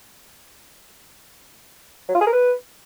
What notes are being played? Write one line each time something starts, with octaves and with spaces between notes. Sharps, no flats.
F#3
F4
G#4
A#4
B4